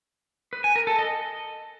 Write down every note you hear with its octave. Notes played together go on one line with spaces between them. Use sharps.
B4
G#5
A#4
A4
D#5